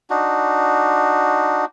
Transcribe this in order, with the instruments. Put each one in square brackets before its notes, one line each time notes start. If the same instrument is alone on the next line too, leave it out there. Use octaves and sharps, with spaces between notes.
[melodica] D4 D#4 F#4